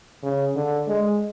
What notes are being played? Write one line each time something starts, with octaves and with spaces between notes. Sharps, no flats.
C#3
D3
G#3